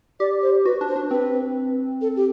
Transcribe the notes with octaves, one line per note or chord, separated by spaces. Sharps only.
G4 D5
C5
F#4 B4
D4
C5
D4
C4 B4
A4
G4